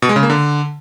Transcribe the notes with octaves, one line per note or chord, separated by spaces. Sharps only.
B2
G#3
C#3
A#3
D3